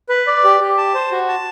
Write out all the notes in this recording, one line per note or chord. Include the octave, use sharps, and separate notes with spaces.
B4
D5
G4
G4
A5
C5
F#4
A5